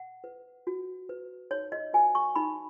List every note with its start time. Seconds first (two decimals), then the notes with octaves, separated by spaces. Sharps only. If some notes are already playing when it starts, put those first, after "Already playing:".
Already playing: F#5
0.24 B4
0.67 F#4
1.09 B4
1.51 D#4 C#5
1.72 D#5
1.93 F#4 B4 G#5
2.15 C#6
2.35 D#4 B5